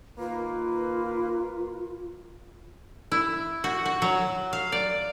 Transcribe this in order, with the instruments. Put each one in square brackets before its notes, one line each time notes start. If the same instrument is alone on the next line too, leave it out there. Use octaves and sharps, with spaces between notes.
[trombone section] D#3 A#3 B4 [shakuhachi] F4
[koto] E4
F#4
F#4
F#3
F5
D5